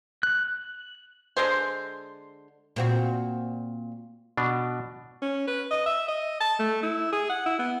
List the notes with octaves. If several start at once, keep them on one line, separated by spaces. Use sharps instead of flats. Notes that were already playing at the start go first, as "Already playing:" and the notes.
F#6
D3 G#3 G#4 C5
A#2 C4 F#4
B2 D4
C#4
B4
D#5
E5
D#5
A5
A3
E4
G#4
F#5
E4
B3